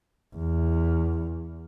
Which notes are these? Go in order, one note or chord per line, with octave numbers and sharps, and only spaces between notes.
E2